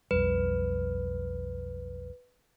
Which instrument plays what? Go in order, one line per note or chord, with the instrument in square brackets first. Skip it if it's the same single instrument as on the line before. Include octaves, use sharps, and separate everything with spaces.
[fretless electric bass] B1 F2 G3 [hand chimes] B4